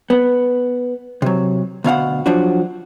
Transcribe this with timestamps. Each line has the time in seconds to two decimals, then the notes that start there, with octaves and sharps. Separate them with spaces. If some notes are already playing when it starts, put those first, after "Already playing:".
0.10 B3
1.22 C3 F#3
1.84 D2 B2 F5 F#5
2.26 F3 F#3 D4 F#4